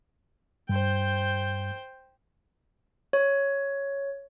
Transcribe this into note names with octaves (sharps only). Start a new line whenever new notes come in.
G2 C5 G5
C#5